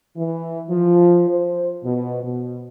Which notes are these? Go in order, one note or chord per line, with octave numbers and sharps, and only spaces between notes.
E3
F3
C5
B2
B2